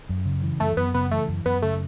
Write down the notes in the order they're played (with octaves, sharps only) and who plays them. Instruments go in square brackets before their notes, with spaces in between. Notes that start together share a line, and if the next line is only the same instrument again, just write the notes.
[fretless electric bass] F#2
C#3
E3
[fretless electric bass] F#2 [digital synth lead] A3
[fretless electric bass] F#2 [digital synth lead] B3
[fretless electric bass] C#3 [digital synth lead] B3
[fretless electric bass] E3 [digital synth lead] A3
[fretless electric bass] F#2
[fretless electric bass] F#2 [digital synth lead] B3
[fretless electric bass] C#3 [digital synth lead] A3